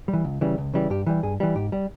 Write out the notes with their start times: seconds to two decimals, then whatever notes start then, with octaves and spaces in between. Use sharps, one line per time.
0.08 G3
0.13 E3
0.24 C#2
0.41 C#3 E3 G3
0.58 C#2
0.74 C#3 E3 G3
0.90 G2 G4
1.06 E3 G3
1.23 G2 G#4
1.40 E3 G3
1.55 G#2 G4
1.72 G3